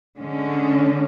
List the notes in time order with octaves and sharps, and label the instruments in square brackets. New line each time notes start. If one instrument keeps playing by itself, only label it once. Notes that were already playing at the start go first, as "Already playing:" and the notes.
[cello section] D3 G#3 C#4